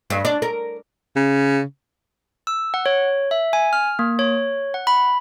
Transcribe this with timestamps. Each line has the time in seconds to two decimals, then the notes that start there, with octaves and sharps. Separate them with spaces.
0.10 G2
0.25 D4
0.42 A#4
1.16 C#3
2.47 E6
2.74 F#5
2.86 C#5
3.31 E5
3.53 G#5
3.73 F6
3.99 A#3
4.19 C#5
4.74 F#5
4.87 B5